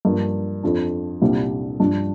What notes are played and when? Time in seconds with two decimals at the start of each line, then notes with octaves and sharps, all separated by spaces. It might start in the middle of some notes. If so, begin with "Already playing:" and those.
0.05 G2 F3 A#3
0.63 F2 F3 D4
1.22 C2 A#2 G3 D4
1.80 G2 F3 D4